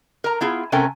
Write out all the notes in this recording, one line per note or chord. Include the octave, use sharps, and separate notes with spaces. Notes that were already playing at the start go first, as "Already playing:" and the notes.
A#4 A#5
B3 E4 F4 G#4
C3 A3 C#4 A#4 G5 G#5